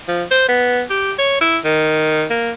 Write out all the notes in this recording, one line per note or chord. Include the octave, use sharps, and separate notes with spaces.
F3
C5
B3
G4
C#5
E4
D#3
A#3